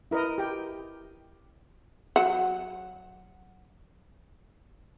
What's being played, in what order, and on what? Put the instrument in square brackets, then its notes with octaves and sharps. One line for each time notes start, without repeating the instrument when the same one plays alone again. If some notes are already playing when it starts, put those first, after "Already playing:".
[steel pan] E4 A#4 B4 D#5
G4 G5
[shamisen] F#3 F#5